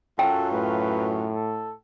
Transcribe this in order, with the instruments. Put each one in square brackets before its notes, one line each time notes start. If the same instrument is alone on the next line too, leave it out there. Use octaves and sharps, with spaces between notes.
[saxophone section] F#2 F#3 F4 [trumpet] A4 [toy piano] G5
[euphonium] A2 [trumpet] B4
[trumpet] A4